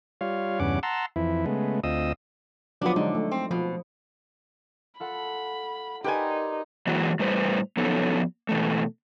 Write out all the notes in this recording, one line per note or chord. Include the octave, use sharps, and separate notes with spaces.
G3 F4 C#5 F5
E2 G2 C#3 C#4 F#5 D6
F#5 A5 A#5 C6 E6
F2 E3 E4
C#3 G#3 A3 B3
D2 C4 F4 D#5 D#6 E6
F3 F#3 B3 D4 F4
D3 G#3 D4 D#4
A3
C4
B2 F3
F4 A4 F#5 B5
D#4 G4 A#4 B4 D5 G#5 C6
E3 F#3 G#3 A#3 F#4
A2 G3 B4 C5
F3 F#3 B3 C#4 D#4 A4
B2 E3 A3